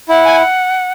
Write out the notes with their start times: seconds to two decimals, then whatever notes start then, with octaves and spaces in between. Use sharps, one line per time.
0.09 E4 F#5
0.25 G#5